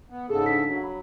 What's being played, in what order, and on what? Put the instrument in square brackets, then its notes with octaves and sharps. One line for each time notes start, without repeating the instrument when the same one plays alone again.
[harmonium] B3
[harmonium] G#2 C#3 A4 [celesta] G#4
[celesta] D4 B6
[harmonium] F#3
[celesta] B5